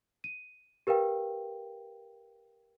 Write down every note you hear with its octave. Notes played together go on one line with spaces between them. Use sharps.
D#7
G4 A#4 B4 F5 G5